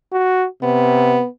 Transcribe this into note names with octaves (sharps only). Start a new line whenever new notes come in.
F#4
C3 B3